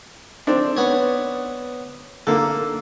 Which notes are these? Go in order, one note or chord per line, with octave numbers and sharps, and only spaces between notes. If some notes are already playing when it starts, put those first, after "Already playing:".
C4 D4
B3 C#5
D3 A#3 A4